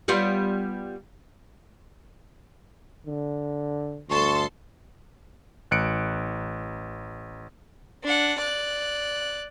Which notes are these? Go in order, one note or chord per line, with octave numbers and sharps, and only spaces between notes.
G3 B3 F4
D3
D2 G2 A4 C6 C#6
A1 F#6 C#7 D7
D4 F#5
D5 F#6